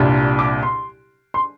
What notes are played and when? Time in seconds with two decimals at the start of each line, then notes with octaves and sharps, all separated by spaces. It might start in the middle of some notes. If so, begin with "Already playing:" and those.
Already playing: C2 A#2 G3 D4
0.39 D6
0.63 C6
1.34 C6